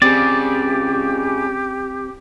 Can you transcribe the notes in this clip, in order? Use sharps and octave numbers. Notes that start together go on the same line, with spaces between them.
C#2 C#3 C4 G4 D5